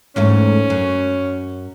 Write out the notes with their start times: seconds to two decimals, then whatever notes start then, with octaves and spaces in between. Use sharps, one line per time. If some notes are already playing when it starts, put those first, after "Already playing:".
0.16 E2 G#2 A3 C#4
0.70 F#2